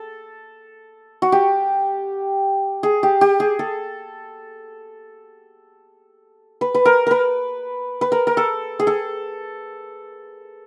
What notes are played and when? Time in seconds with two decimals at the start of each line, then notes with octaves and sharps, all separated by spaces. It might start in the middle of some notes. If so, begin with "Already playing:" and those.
Already playing: A4
1.22 F#4
1.32 G4
2.83 G#4
3.03 G4
3.21 G4
3.40 G#4
3.59 A4
6.61 B4
6.75 B4
6.85 A#4
7.07 A#4 B4
8.01 B4
8.12 A#4
8.27 A#4
8.37 A4
8.79 G#4
8.87 A4